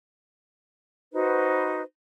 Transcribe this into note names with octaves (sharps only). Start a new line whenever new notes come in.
D#4 F#4 B4 C5